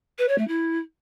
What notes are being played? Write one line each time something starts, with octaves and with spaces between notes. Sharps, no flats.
B4
C#5
A3
E4